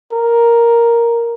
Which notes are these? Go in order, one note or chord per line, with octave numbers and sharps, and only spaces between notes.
A#4